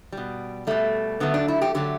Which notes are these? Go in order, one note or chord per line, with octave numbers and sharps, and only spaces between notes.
B2 G3
B2 G3 A3
D3 F#3 A3 B3
D4
E4
G4
D3 F#3 A3 G4